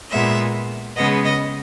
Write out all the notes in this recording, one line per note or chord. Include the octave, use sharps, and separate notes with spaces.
A#2 G#3 B3 E5
C#3 G#3 B3 D#5
D#5